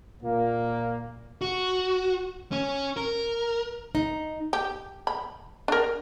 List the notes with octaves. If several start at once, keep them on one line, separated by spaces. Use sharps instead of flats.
A#2 A#3
F#4
C#4
A#4
D#4
G4
B5
D4 A#4